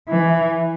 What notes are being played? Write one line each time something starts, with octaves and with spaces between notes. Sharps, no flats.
E3